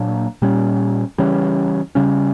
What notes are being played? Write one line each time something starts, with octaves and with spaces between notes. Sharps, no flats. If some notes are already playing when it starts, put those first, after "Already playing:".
Already playing: A#2 F#3 A#3 D4
A#2 G3 C#4
C#3 E3 G3 C#4
C#3 G3 C#4